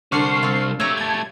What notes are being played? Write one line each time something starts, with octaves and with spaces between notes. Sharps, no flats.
C2 D3 D4 C5 C#6 F6 C7
C4 F4
A3 G4 C#5 A#5 E6
A5 G#6